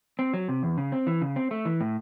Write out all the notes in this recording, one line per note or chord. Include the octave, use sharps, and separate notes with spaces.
C4
F#3
C3
E2
C#3
C4
E3
C#3
C4
A3
E3
A2